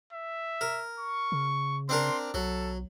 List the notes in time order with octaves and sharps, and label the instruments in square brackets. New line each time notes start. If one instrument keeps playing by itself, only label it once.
[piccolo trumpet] E5
[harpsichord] A#4
[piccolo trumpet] C#6
[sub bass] C#3
[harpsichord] C4 D4 A#4 [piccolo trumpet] C6
[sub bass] B1 [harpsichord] F#3 [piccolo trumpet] A4